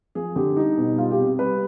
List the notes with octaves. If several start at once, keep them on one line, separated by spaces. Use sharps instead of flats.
F3 G#4
D3 G4
G3 D#4
B2
G3 F4
G4
C3
G3 B4